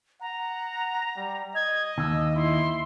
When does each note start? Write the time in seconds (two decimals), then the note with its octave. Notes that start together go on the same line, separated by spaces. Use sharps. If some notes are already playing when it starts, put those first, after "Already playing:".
0.21 F#5 A#5
1.16 G3
1.55 D#5 G#6
1.98 D#2 E6
2.36 E4 C6